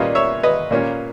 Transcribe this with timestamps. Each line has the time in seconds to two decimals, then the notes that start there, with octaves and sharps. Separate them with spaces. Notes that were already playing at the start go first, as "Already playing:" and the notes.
Already playing: A#2 G3 A#3 C#4 B4 D#5
0.15 C#5 E5
0.43 B4 D#5
0.71 A#2 A#3 C#4